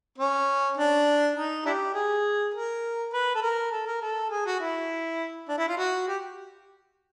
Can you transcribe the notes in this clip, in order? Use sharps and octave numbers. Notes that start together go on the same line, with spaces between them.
C#4
D4
D#4
D4 E4 G4
G#4
A#4
B4
A4
A#4
A4
A#4
A4
G#4
F#4
E4
D4
E4
F4
F#4
G4